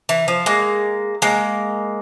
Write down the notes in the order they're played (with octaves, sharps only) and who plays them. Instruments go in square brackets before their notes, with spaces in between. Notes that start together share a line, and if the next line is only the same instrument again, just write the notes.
[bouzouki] E3
F3
G#3 A#3
G#3 A#3